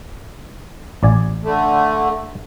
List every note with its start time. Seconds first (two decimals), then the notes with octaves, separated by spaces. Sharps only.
1.03 A1 D5 G#5
1.44 D3 A3